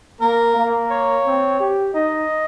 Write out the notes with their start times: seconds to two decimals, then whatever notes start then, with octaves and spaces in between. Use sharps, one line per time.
0.20 A#3 A#4
0.55 A#3
0.90 C#5
1.25 C4
1.59 G4
1.94 D#4 D#5